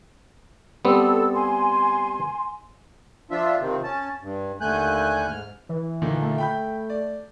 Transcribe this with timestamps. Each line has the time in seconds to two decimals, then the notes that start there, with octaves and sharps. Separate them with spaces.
0.85 G3 B3 C4 A4 E6
1.34 G#5 C6
3.31 F3 D4 F4 E5
3.61 C3 D#3 F3 C4
3.83 C#4 A5
4.22 G2
4.61 D#2 D3 A3 G#5 F#6 G6
5.28 G#2 F6
5.69 E3
6.02 A#2 D3 D#3
6.22 A3
6.38 G5 B5 G6
6.90 D5